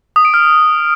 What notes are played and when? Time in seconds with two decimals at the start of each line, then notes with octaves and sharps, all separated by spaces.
0.16 D#6
0.25 D7
0.34 F6